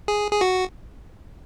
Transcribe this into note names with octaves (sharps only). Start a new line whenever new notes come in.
G#4
G#4
F#4